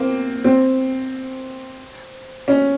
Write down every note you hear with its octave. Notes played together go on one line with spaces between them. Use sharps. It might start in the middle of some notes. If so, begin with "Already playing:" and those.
Already playing: A#3 C4
C4
C#4